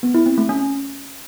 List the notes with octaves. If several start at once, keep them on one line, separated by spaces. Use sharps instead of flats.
B3
E4
C4
A3
C#4